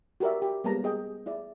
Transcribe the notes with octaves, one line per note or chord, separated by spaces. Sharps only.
F#4 G4 A#4 D5 E5
G4
G3 G#3 A#3 B3 A5 A#5
G#4 D#5 G5
E4 G#4 D5